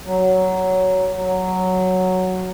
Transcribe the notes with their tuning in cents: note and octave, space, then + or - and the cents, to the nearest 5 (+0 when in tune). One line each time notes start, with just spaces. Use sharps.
F#3 +10
F#3 +0